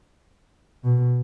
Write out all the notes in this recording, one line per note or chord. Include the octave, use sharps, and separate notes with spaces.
B2